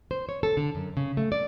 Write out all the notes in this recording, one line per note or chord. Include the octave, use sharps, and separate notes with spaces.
C5
C#5
A4
D3
F#2
C#3
A3
D5